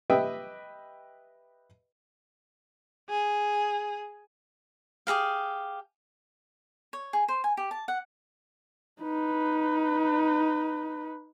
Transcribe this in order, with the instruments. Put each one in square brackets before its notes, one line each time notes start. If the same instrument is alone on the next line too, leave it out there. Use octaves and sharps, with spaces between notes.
[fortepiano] G4 B4 D#5 E5 G5 D#6
[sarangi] G#4
[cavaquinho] G4 G#4 A#4 F5
C#5
G#4
C5
G#5
G4
A5
F#5
[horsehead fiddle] D#4 B4